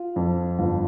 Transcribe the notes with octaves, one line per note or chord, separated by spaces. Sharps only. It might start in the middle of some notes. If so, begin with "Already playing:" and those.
Already playing: F4
F2
G1 F4